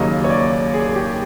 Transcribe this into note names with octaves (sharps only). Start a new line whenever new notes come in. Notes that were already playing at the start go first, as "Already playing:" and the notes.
Already playing: D#2 C#3 F#3 A#3 D#5
C#5
D5
G#4
G4